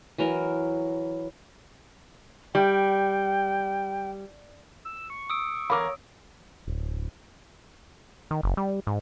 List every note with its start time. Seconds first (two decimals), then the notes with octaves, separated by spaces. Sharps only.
0.18 E3 F#3 A#4
2.55 G3 G5
4.85 E6
5.10 C#6
5.30 D#6 E6 D7
5.70 E2 A#4 C#5 F5 B5 D6
6.67 D1
8.31 D#3
8.43 F#1
8.57 G3
8.87 G#2